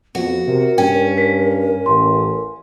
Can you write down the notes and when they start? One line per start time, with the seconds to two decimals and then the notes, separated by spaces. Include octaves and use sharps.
0.15 F2 B3 F#4
0.47 C3 A#4
0.78 G2 C#4 G5
1.18 B6
1.86 A1 C6